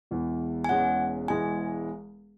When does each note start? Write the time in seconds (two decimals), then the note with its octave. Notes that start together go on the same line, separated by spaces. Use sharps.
0.11 E1 E2 E3
0.64 G#5
0.69 E1 E2 E3 G#3 C#4 F#5
1.28 E1 E2 E3 G#3 B3 G#5